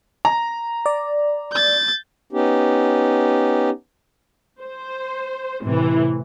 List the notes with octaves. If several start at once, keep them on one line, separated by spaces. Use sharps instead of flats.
A#5
D5
G6 A6
B3 C#4 D#4 G4
C5
A2 C3 E3